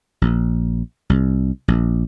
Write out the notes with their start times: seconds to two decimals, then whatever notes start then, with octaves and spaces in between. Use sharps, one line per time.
0.22 A#1
1.10 C2
1.68 A#1